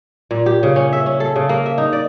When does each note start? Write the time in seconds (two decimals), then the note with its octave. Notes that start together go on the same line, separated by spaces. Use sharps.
0.31 A#2
0.46 G4
0.63 C#3
0.76 C#4
0.93 E5
1.06 C#4
1.20 A4
1.36 C#3
1.49 A#3
1.66 E5
1.78 D#4
1.93 D5